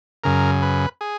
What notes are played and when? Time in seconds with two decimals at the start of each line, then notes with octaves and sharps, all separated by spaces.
0.24 F#2 C#3 A#4
0.62 B4
1.01 G#4